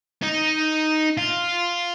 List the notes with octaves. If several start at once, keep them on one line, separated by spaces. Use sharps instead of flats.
D#4
F4